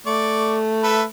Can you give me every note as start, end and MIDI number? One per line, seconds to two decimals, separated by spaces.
0.06 1.06 57
0.06 0.56 74
0.06 0.56 85
0.83 1.03 69
0.83 1.03 71
0.83 1.03 76